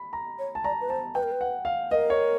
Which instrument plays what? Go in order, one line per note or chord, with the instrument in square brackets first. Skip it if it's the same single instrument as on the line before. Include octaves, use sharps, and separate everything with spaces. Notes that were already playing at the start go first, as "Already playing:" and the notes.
Already playing: [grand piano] B5
A#5
[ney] C#5
[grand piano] A5
[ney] D5 [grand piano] A#5
[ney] B4
[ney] C5 [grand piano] A5
[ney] B4 [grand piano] G5
[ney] A#4
B4
[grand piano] F#5
F5
[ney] A#4 B4 [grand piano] D#5
[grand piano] C#5